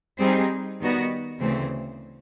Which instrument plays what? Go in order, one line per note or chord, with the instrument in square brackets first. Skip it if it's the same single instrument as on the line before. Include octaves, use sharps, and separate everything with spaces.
[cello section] G3 C4 D#4 G#4
D#3 G3 B3 D#4 F#4
D2 C#3 E3 A3 C4